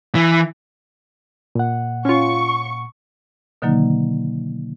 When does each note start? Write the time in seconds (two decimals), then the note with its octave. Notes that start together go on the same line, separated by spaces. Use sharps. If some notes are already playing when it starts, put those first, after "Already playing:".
0.15 E3
1.55 A#2 F#5
2.05 C#4 F4 C#6
3.62 B2 D3 D#3 F#3 A#3 D#4